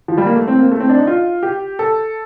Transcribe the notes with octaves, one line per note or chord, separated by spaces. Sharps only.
F3
G3
A#3
A3
C4
A#3
A3
C4
D4
D#4
F4
G4
A4